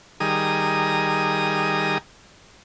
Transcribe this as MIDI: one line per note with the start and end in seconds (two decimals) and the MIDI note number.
0.20 1.98 51
0.20 1.98 55
0.20 1.98 68
0.20 1.98 82
0.20 1.98 87